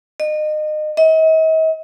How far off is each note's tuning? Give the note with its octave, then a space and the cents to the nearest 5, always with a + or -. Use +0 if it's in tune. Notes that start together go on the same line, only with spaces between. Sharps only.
D#5 -30
D#5 +45